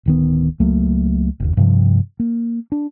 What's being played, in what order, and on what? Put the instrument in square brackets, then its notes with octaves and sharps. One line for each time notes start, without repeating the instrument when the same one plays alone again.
[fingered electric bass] D1 D#3 B3
C#2 F#3 A3 A#3
F#1 D#2
G2 C3 F3
A#3
D4